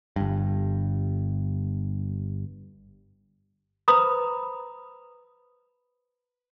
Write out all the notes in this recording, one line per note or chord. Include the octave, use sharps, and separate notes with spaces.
G1 G2
B4 C5 A#5 B5 D#6